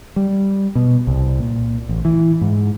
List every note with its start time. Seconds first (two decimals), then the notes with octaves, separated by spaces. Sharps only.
0.16 G3
0.75 B2
1.07 C2
1.39 A#2
1.89 A1
2.05 E3
2.41 G#2